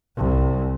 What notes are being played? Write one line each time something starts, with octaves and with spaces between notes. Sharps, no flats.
C2